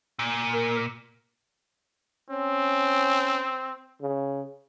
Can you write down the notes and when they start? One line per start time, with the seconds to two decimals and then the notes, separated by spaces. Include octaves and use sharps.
0.19 A#2
0.53 A#4
2.30 C4 C#4
4.01 C#3